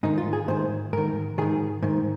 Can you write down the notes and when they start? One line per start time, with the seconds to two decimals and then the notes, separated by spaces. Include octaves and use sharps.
0.03 G#2 D#3 D#4
0.18 F4
0.33 G#4
0.48 G#2 D#3 C5
0.93 G#2 D#3 A#4
1.38 D#3 G#4
1.41 G#2
1.83 G#2 D#3